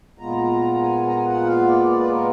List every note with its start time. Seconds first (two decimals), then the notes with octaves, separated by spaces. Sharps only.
0.19 A#2 G#3 B3 F4 A#5
0.82 G#5
1.07 A#5
1.16 G#5
1.26 F#5
1.46 F5
1.67 D5
1.89 D5
1.99 B4
2.10 A#4